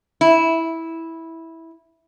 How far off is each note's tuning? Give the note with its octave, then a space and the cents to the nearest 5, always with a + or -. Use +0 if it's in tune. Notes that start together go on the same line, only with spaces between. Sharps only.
E4 -10